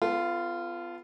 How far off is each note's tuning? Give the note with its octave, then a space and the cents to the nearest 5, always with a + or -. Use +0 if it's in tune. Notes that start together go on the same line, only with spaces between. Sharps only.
B3 +30 F4 -15 A4 +0